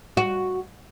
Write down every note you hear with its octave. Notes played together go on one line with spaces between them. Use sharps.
F#4